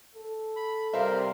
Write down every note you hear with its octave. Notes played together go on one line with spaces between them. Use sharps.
A4
B5
C3 G3 A#4 C5 E5 F5